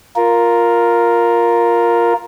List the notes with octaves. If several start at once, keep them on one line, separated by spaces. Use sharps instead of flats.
F4 A#4